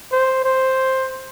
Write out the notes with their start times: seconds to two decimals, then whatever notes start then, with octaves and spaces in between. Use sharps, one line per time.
0.12 C5
0.44 C5